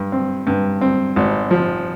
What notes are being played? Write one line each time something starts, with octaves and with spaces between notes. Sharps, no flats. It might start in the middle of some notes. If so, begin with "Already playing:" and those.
Already playing: G2
C4
G2
C4
G#1
F3